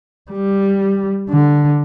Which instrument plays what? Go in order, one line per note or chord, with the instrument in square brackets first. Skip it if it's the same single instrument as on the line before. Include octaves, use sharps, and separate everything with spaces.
[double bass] G3
D3